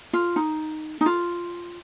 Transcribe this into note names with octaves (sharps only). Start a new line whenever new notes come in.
F4
D#4
D#4
F4